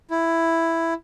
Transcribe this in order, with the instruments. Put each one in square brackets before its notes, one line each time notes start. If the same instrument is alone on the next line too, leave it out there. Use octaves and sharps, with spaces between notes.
[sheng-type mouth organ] E4